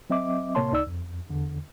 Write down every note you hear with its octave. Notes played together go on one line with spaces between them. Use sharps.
F#3 C4 D#5 E5 D6
A2 C3 A#3 C#5 A5 C6
C#2 D#4 D5 E6
F2
E2 D3